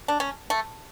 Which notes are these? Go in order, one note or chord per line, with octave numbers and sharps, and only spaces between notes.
D4
C#4
A3